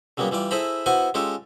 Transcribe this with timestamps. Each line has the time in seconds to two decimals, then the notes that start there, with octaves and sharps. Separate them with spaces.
0.17 C#3 F#3 G3 A#3 B3
0.31 E3 G3 F4 D5
0.51 E4 G#4 A4 C5 A#5 B5
0.86 B3 E4 F#4 C5 F#5 G#5
1.14 G#3 C#4 F4 G4 A4